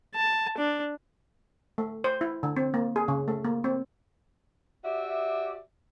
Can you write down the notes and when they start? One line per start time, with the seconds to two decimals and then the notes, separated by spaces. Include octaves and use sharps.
0.15 A5
0.58 D4
1.78 A3
2.04 C5
2.21 E4
2.43 D3
2.56 C4
2.74 A#3
2.96 G#4
3.08 C#3
3.28 A3
3.45 A#3
3.64 C4
4.84 F#4 G4 D5 E5